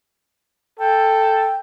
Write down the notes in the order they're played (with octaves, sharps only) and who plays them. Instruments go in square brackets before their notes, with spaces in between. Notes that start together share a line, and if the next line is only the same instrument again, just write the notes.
[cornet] A4 [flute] G5